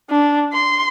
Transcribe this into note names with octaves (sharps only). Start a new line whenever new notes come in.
D4
C6